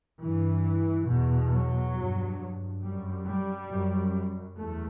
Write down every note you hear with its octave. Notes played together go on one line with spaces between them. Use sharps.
G2 E3
E2 B2
F#3
G2
F#2 G3
G3
F#2
E2 A3